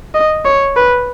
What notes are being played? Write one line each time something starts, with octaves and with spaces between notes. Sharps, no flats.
D#5
C#5
B4